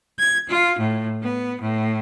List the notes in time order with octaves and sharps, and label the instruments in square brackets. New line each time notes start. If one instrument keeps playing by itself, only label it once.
[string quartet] G#6
F4
A2
B3
A2